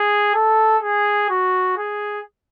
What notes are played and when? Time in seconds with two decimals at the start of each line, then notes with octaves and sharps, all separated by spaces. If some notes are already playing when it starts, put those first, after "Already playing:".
Already playing: G#4
0.34 A4
0.83 G#4
1.30 F#4
1.77 G#4